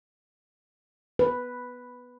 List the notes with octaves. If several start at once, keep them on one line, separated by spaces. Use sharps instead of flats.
B4